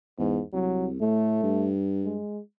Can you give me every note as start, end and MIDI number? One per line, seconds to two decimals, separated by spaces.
0.19 0.40 40
0.19 0.43 44
0.53 1.00 36
0.53 0.87 54
1.01 1.39 45
1.01 1.72 57
1.43 2.19 43
2.05 2.40 56